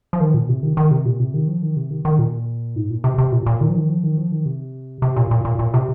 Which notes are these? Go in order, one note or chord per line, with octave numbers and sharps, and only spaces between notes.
F3
D#3
A#2
C3
D#3
D#3
C3
A#2
C3
D#3
F3
D#3
C3
D#3
D#3
A#2
G#2
A#2
C3
C3
A#2
A#2
D#3
F3
D#3
F3
D#3
F3
D#3
C3
C3
A#2
A#2
A#2
A#2
C3